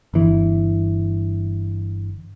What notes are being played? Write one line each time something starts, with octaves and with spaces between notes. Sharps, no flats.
G1 E3